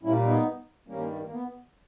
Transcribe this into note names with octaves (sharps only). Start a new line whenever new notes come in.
A#2 G3 A#3 C#4 E4
B3 D#4
G2 D#3 G3 A#3 C#4
A#3
B3